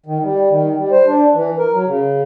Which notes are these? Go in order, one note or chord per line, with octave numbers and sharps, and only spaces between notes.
D#3
G3
D#3
G3
C5
D4
E3
A#4
F#3
C#3